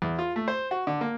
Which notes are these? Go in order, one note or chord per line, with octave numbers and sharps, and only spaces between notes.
E2
F4
A3
C5
F#4
D3
A#3